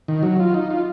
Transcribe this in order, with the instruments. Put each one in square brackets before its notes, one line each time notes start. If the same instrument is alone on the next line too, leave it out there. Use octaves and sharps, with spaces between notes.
[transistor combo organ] D#3
F#3
F4
D#4
F4